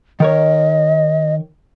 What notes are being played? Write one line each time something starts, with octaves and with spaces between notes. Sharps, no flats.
D#3 A#4 C#5 D#5